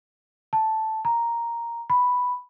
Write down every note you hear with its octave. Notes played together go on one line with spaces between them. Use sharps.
A5
A#5
B5